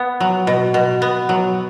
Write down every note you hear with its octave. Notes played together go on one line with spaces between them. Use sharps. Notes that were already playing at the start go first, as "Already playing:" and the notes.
Already playing: B3
F#3
B2
B2
B3
F#3